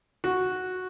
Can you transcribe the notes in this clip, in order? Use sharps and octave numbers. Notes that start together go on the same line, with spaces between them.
F#4